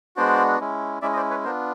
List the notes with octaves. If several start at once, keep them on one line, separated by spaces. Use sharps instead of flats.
G#3 B3 D4 F#4 C5 D5
G#3 C#4 E4
G#3 C#4 E4 D5 E5
D#5
C5 D5
B4 C#5
B3 D4 F4 A#4 C5